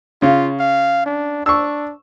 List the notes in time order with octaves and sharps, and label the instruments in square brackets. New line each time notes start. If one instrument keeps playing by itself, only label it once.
[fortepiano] C#3 [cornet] F4
[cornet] F5
D4
[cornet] D4 [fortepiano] C#6 E6